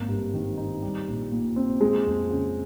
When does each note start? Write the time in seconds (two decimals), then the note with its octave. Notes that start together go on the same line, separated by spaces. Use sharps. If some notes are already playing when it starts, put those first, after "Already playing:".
Already playing: G#1 A#3
0.08 G2
0.34 D#3
0.57 D#4
0.82 G3
1.08 A#1
1.32 A#2
1.56 C4
1.81 G#3
2.06 F2
2.30 C#3